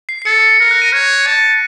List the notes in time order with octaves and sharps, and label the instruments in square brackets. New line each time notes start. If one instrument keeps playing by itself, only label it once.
[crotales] C7
C7
[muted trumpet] A4 [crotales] C#7
[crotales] C#7
[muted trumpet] A#4 [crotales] A#6
[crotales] F#6
D#7
[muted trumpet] C#5
A5